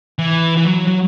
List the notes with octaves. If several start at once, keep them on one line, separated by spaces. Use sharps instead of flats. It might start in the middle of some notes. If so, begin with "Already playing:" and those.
E3
E3
F#3
F#3